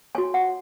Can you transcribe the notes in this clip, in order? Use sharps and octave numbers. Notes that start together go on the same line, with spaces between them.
F#4 C#5 G#5
F#5